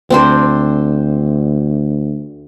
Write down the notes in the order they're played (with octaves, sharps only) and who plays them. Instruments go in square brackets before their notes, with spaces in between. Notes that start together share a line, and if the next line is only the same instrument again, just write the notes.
[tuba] D2 [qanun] C4 D4 C5